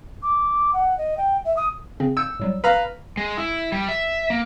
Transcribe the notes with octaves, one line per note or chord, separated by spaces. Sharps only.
D6
F#5
D#5
G5
E5
D#6
C#3 C4
E6 G6 C#7
A2 F#3 G3
B4 F5 A#5
G#3
E4
G3
E5
A#3